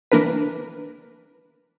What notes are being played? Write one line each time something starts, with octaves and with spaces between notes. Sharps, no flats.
E3 A#3 D4 A#4 B4